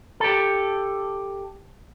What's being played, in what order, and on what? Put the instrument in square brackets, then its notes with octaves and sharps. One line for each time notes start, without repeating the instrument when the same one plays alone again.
[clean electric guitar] G4 A4